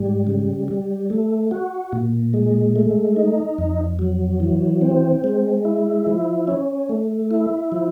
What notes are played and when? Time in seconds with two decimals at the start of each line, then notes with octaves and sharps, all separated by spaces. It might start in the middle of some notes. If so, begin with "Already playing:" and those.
Already playing: G#2 G3
0.27 C#3
0.68 G3
1.10 A3
1.51 F#4
1.93 A#2
2.34 G#3
2.76 A3
3.16 D#4
3.58 F2
3.99 F#3
4.40 E3
4.82 C4
5.24 G#3
5.65 E4
6.07 F3
6.48 C#4
6.89 A3
7.31 E4
7.72 F3